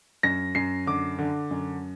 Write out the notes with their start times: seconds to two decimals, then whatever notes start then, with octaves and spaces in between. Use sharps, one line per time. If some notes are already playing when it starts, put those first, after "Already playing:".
0.23 F#2 A#6
0.55 F#2 C7
0.86 D3 D6
1.19 D3
1.51 F#2